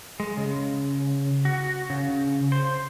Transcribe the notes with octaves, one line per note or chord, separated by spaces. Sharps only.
G#3
C#3
F#4
C#3
C5